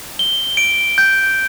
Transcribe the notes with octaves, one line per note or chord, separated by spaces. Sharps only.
G7
D7
G6